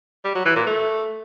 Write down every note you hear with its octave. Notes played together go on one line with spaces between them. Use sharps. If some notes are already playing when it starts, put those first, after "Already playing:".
G3
F#3
E3
A#2
A3